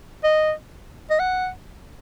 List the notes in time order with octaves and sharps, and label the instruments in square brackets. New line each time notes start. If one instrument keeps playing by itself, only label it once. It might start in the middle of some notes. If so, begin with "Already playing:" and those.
[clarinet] D#5
D#5
F#5